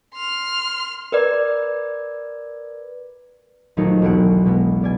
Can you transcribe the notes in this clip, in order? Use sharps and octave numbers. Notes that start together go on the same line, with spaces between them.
C6 F6
A#4 B4 D5
A#1 D#2 F#3 A3 D#4 C#7
E1 B1 G#4 F#5 D7
B2 G#3 B3
B2 D5 G#5